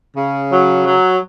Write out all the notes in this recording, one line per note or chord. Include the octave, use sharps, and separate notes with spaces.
C#3
F#3
F#3